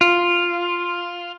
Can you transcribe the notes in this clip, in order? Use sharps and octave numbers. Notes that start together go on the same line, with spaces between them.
F4